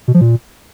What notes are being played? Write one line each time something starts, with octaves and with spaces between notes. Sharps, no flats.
B2
F3
A#2